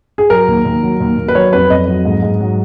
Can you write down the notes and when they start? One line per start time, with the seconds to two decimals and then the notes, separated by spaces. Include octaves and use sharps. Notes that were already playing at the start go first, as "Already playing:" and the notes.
0.18 G#4
0.30 F#3 A#4
0.48 D#2
0.65 D#2
0.83 F#3
1.00 D#2
1.18 D#2
1.28 B4
1.35 F#3 C#5
1.53 F2 B4
1.70 F2 D#5
1.88 F#3
2.05 G#2
2.22 G#2
2.40 F#3